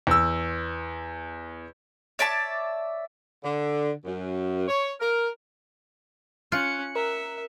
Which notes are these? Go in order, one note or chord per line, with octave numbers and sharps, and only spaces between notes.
E2 E6
C#5 D5 E5 A5
D3
F#2
C#5
A#4
C#4 F4 F#6 C#7
A#4 E5